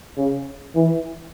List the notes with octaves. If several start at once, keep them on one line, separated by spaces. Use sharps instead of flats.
C#3
E3